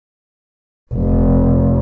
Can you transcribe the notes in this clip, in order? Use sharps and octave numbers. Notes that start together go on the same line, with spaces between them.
F1